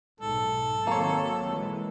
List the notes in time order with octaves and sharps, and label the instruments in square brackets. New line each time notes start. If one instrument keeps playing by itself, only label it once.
[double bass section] B1 G#2 [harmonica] A4
[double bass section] D#3 F#3 C4 [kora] A#3 C#5
[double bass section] E3 G#3